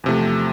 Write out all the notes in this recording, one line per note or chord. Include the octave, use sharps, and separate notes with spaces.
E2 C3 F3 A3